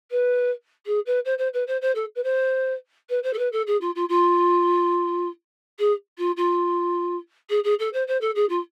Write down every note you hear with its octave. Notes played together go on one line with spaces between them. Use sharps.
B4
G#4
B4
C5
C5
B4
C5
C5
A4
B4
C5
B4
C5
A4
B4
A4
G#4
F4
F4
F4
G#4
F4
F4
G#4
G#4
A4
C5
C5
A4
G#4
F4